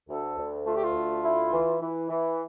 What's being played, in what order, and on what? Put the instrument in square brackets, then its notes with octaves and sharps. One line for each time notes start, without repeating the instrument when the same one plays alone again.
[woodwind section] D2 [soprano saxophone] A4
[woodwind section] D2
[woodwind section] A3 [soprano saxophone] F4
[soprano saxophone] G4
F4
[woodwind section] D2
E4
E3
E3
E3